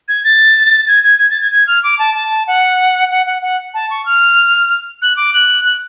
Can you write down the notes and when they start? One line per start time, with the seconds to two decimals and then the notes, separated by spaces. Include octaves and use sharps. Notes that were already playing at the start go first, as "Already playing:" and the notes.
0.08 G#6
0.24 A6
0.88 G#6
1.04 G#6
1.19 G#6
1.30 A6
1.41 G#6
1.52 G#6
1.67 F6
1.84 D6
1.99 A5
2.15 A5
2.47 F#5
3.10 F#5
3.27 F#5
3.42 F#5
3.74 A5
3.90 C#6
4.06 F6
5.02 F#6
5.17 D6
5.33 F#6
5.65 F#6